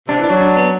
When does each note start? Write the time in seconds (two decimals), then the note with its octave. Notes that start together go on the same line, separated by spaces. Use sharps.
0.08 C3 D4
0.19 E3
0.24 D4
0.29 F#3
0.41 D4
0.57 B3